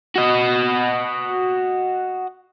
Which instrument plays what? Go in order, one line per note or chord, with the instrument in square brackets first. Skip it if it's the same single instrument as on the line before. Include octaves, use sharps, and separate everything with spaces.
[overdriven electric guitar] F#4 D#5